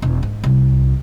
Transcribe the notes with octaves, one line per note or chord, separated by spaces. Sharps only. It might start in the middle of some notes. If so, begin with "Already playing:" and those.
E1
G#2
C2